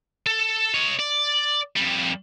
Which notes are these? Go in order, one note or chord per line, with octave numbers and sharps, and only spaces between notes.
A4
C#5 D#5
D5
F2 G3